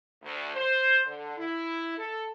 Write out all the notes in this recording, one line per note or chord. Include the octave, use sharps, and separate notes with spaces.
D2
C5
D3
E4
A4